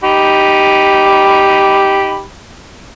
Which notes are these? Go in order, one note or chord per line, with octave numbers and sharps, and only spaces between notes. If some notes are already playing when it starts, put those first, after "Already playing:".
D#4 G4 B5